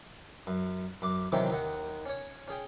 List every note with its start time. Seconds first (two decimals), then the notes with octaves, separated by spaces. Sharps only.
0.47 F#2
1.02 F#2 D6
1.32 C3 D#3 E3 F#3 C4 C#4
1.50 D#2 D#3 F#5
2.06 C#4 C#5
2.48 C#4 G#4 G5